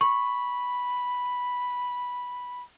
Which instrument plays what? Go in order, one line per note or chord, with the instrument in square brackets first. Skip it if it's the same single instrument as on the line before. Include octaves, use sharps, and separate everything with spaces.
[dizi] B5 [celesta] C#6